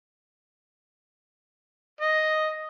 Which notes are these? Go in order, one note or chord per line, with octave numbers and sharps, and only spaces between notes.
D#5